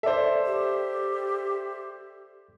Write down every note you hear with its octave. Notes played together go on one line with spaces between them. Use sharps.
A4 C5 D5 E5
G4